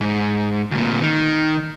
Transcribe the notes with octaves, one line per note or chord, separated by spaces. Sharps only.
G#2
D2 A#2
D#3